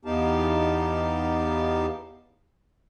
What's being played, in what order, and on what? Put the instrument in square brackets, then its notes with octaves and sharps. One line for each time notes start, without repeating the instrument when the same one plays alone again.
[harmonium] E2 B3 D#4 G4 F5 A5